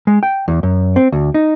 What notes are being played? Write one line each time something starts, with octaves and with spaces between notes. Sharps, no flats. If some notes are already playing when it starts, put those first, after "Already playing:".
G#3
G5
E2
F#2
C4
D2
D#4